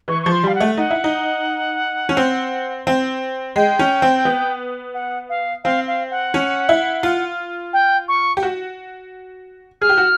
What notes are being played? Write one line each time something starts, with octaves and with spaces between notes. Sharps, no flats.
E3 C#6
F3 C#6
C6
G3 F5
F#5
A3
D#4 F#5
E4
D#4
C#4
C4
C4
G#3 G5
C#4
C4
B3
F#5
F5
C4 F5
F5
F#5
C#4
E4
F4
G5
C#6
G4
F#4
G#4 F6
G4
F#4